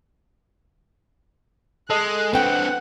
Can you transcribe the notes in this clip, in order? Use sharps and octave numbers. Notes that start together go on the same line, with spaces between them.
G#3 A4 D#5 F#6
C4 D4 B4 F#5 G5